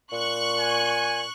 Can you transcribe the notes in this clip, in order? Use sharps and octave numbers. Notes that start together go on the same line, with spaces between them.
A#2 C#6 F#6
G#5